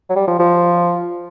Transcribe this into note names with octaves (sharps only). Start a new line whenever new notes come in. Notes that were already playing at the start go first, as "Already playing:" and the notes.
F#3
G3
F3
F3